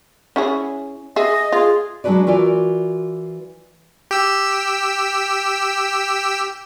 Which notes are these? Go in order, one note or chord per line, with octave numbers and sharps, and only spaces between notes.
C#4 E4 G#4
G#4 D#5 E5
F4 G#4
F#3 G#3 D4 F#4 B4 D5
E3 F4 F#4 A#4 D5
G4 E6